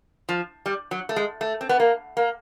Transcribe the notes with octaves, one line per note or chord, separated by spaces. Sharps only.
F3
G3
F#3
A3
G#3
A3
C4
B3
A#3
A#3